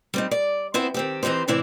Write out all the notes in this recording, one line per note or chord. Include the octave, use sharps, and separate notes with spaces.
G3 C4 D#4
D5
B3 C4 E4 C5
D#3 C4 G4
E3 C4 D#4 G4 C5
A2 C3 E3 C4 E4 D5